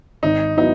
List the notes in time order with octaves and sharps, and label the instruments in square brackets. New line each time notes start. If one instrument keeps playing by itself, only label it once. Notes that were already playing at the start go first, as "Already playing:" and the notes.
[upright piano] G#1 [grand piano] D#4
[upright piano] F#3 B3 E4 [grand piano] D#4